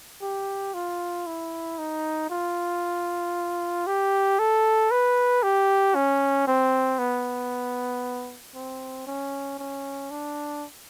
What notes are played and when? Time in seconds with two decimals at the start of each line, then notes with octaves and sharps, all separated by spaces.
0.22 G4
0.74 F4
1.27 E4
1.79 D#4
2.30 F4
3.87 G4
4.39 A4
4.91 B4
5.43 G4
5.95 C#4
6.47 C4
6.99 B3
8.55 C4
9.07 C#4
9.59 C#4
10.10 D4